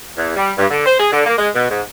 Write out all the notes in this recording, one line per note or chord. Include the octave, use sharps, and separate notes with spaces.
E2
G3
G2
D3
C5
G#4
D3
A#3
G#3
B2
G#2